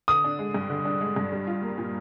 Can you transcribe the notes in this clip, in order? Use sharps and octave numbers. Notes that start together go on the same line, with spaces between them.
D3 D#6
D4
G#3
G2
D3
D4
G#3
G2
G3
F4
A#3
A#2